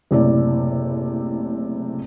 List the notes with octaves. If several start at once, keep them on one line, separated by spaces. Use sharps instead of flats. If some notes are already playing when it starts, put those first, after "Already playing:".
F#1 A2 C3 E4 D5